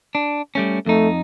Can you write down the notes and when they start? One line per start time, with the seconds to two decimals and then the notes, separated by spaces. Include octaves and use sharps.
0.15 D4
0.55 G3 A3 C#4
0.86 F2 A3 D#4